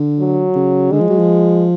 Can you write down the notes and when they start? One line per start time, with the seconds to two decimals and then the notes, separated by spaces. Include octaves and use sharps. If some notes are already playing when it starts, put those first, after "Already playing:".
Already playing: D3
0.19 F#3
0.56 C#3
0.92 D3 G#3
1.01 F3
1.09 F#3
1.19 F3